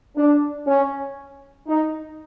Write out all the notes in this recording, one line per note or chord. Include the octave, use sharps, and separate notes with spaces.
D4
C#4
D#4